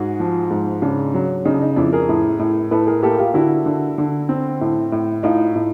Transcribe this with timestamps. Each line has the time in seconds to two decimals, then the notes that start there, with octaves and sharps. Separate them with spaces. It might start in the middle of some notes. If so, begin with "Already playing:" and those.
Already playing: G#2 F#4 G#4
0.20 F3
0.50 G#2
0.82 C#3 D4
1.14 F#3
1.45 C#3 D#4
1.54 D4
1.61 D#4
1.76 F2 D4 E4
1.92 G#4 A#4
2.09 A2
2.39 A2
2.71 A2 A4 B4
2.87 G#4 A#4
3.03 A#3 G4 A4
3.18 F4 G4
3.34 D3 E4 F#4
3.66 D3
3.98 D3
4.29 C4
4.61 A2
4.92 A2
5.23 A2 D#4 F4
5.56 A2